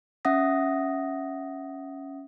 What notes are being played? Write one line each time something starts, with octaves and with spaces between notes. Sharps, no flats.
C#4 E5 F#5 D#6 A#6